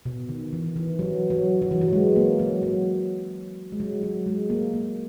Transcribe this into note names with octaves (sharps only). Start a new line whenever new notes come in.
B2
D#3
E3
E3
F#3
F#3
F#3
E3
F#3
G#3
A#3
F#3
F#3
G#3
F#3
F#3
G#3
A#3
A#3